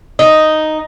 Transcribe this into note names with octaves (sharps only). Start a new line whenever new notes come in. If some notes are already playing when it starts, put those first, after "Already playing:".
D#4